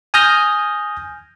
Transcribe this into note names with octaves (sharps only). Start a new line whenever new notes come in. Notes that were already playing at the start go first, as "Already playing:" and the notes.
G#5 D#6 F6 G6 A#6